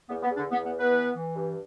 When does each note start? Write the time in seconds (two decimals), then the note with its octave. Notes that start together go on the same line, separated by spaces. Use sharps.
0.09 E2 B3
0.23 B3
0.30 E2
0.37 D3 D4
0.51 E2 B3
0.65 B3
0.72 E3
0.79 B3 B4
0.93 E3
1.14 E3
1.36 G2